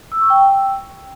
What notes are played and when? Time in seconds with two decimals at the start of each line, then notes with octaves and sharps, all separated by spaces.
0.12 E6
0.21 C#6
0.30 G5